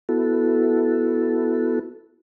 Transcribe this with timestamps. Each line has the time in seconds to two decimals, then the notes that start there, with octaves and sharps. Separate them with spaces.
0.09 B3 E4 F#4 A4